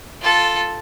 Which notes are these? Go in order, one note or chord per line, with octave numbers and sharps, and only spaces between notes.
F4 A4